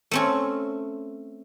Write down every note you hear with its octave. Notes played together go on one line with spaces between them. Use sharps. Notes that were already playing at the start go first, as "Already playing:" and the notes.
A3 C4 C#4